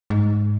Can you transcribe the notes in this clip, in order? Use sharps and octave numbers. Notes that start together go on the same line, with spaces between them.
G#2